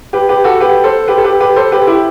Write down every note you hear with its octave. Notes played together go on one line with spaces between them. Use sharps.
G4 B4
G4 B4
F#4 A4
G4 B4
A4 C5
G4 B4
A4
G4 B4
G4 B4
A4 C5
G4 B4
E4 G4